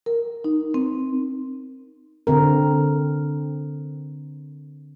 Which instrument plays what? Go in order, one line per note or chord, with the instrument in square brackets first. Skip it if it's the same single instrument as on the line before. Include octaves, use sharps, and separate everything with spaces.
[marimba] A#4
D#4
C4
[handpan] D3 C4 A#4